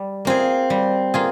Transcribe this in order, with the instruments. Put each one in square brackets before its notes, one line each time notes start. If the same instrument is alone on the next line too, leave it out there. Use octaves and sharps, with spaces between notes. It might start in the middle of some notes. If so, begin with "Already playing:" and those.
Already playing: [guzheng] G3
[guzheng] A#3 F4 G#4 [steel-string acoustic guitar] C4
[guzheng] G3
A#3 F4 G#4